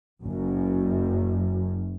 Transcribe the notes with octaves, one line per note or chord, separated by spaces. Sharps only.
F#1 F#2